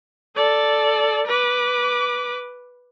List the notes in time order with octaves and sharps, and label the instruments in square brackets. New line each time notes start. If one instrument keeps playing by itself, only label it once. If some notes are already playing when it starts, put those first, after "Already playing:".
[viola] A4 D5
B4 D6